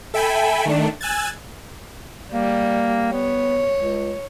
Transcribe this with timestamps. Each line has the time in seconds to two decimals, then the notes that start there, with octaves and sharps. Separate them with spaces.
0.14 A4 E5 G5 G#5 B5
0.65 D#3 A3 D4
1.01 G#5 E6 F#6 G#6 A6
2.33 G3 A#3
3.13 B3 C#5
3.80 C#2